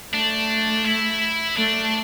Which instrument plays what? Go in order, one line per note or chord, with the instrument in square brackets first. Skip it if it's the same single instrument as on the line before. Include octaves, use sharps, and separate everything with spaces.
[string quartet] A3 [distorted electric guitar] D4
[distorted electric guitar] E4
[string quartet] A3 [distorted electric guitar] D4